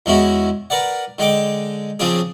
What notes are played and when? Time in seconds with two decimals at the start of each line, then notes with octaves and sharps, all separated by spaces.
0.06 E2 G#3 C#4 E4 F#4
0.70 A#4 B4 D5 F#5
1.18 D3 G#3 G5 D6
2.00 C#3 F3 C4 D4 G#4